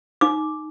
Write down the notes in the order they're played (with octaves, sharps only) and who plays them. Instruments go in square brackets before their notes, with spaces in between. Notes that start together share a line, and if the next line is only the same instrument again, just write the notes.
[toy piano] D#4 D6